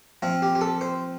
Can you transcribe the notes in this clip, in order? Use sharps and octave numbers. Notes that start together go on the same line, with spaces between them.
F3 C4 F4
G4
G4
A4
C5